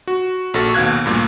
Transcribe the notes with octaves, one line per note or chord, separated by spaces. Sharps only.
F#4
A#1 F#4 A4 C#6
D#2 B2 F5 F#6 G#6
D2 G2 A#2